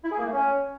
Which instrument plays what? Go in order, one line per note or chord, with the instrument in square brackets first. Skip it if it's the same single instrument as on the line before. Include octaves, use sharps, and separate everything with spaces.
[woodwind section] E4
G#4
A#3
A3
C#4